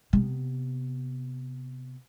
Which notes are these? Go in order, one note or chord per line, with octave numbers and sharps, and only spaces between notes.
C3 B3